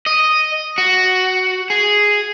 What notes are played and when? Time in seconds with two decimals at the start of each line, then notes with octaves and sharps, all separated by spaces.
0.06 D#5
0.78 F#4
1.70 G#4